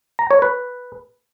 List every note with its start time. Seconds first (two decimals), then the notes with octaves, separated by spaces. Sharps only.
0.19 A#5
0.31 C#5
0.42 B4